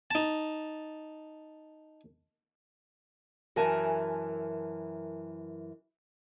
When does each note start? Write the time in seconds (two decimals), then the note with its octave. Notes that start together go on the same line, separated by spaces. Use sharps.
0.11 D#4 A5
3.56 F#2 E3 A#4 E5 G#5 A5